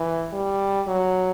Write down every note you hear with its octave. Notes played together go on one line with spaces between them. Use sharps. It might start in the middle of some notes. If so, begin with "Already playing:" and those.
Already playing: E3
G3
F#3